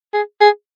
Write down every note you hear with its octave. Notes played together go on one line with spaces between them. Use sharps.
G#4
G#4